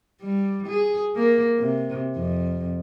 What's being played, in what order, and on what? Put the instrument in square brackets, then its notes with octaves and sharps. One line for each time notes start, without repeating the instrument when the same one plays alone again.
[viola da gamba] G3
G#4
A#3
C3
F2